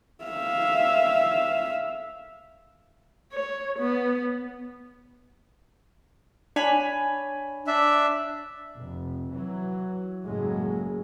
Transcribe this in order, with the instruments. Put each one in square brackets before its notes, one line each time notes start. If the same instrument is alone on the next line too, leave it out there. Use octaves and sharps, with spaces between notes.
[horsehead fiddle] E5 F5
[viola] C#5
B3
[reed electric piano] D4 [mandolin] C#5 G#5 B5
[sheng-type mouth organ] D4 E5
[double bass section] F1
E3 F#3
F#1 A2 C#3 F#3 G#3